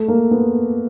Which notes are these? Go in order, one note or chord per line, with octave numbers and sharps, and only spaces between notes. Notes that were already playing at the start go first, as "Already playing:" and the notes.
Already playing: A3
A#3
B3